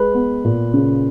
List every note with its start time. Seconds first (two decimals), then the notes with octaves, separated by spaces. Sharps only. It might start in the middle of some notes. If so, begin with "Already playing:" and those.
Already playing: G#3 B4
0.14 B3
0.45 A#2
0.74 C#3